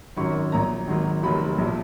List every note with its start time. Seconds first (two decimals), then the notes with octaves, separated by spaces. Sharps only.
0.17 G#1 F#2 D#3 F#3 C#6
0.52 A#1 A#2 F#3 A#5
0.87 G#1 G#2 D#3 F#3
1.23 F1 D#2 D#3 F#3 B5
1.58 A#1 A#2 F3